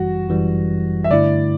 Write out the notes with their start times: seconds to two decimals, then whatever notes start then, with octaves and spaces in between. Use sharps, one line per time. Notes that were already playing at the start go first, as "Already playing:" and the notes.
Already playing: G1 F#2 E3 G3 F#4
0.29 G1 F#2 E3 G3
1.04 E5
1.10 G2 D3 A3 E4 D5